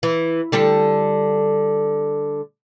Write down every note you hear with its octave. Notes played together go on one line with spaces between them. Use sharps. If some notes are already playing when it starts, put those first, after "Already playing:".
E3
D3 G3 A4